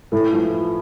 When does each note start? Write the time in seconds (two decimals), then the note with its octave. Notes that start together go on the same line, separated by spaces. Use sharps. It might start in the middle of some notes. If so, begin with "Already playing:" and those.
0.12 A2 E3
0.33 F3